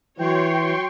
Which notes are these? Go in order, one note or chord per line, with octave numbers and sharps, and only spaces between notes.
E3 F#3 F#4 C#5 G5 C6 C#6